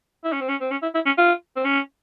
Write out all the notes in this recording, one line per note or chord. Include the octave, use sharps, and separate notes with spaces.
E4
C#4
C4
C#4
C4
C#4
E4
E4
C#4
F4
C4
C#4